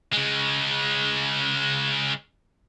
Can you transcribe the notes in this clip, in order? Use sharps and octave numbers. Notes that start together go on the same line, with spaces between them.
C#3 G#3